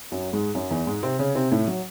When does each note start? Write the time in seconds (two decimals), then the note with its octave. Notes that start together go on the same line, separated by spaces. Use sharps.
0.12 F#2 F#3
0.33 G#2 G#3
0.55 F#2 F#3
0.70 E2 E3
0.87 G#2 G#3
1.03 C3 C4
1.19 C#3 C#4
1.35 C3 C4
1.52 A2 A3
1.67 F#3